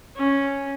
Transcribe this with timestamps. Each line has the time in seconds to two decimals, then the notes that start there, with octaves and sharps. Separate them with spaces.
0.16 C#4